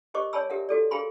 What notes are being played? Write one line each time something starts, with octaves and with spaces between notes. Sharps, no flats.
G4 A#4 C5 D#5 C#6 D6
C#5 D5 G#5 A5 B5 E6
G4 A#4 E5 F#5
F#4 A4 D5
G#4 A#4 F5 G#5 B5 C6